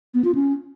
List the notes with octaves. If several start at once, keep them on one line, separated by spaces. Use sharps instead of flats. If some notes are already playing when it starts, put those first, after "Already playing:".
B3
F4
C#4